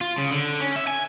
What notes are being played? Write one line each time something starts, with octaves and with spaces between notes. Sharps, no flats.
F4
C#3
D3
C#4
E5
G#5